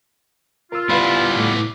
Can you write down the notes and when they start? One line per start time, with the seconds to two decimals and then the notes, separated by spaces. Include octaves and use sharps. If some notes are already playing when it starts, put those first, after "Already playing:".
0.72 F4 A#4 E6
0.90 G3 B3 E4 B4 C5 F5 B5
1.36 A2 A3 D6